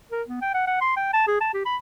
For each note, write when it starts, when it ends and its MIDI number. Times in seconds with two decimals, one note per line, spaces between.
0.11 0.22 70
0.28 0.41 59
0.42 0.50 79
0.54 0.65 78
0.67 0.78 78
0.81 0.94 84
0.97 1.13 79
1.13 1.24 81
1.27 1.40 68
1.41 1.49 81
1.54 1.63 67
1.65 1.76 83